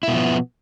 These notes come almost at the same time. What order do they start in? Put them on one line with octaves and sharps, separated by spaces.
E4 B2 F3 B3